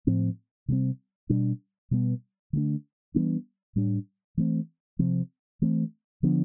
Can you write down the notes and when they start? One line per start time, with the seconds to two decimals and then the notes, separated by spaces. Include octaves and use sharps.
0.07 A2 F3 C4
0.68 C3 G3 C4
1.29 B2 G3 D4
1.91 B2 G3 B3
2.53 D3 A3 D4
3.14 E3 G3 B3 D4
3.76 A2 G3 D4
4.37 E3 A3 C4
4.99 C3 F3 C4
5.62 E3 A3 C4
6.23 D3 F3 B3 D4